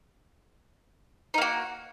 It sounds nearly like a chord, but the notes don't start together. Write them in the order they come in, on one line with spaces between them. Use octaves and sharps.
D#4 A#3 F#4